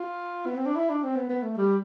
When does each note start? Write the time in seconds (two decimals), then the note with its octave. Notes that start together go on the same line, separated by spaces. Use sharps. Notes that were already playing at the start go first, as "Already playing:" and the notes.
Already playing: F4
0.46 B3
0.56 C4
0.66 D4
0.76 E4
0.90 D4
1.04 C4
1.16 B3
1.29 B3
1.43 A3
1.57 G3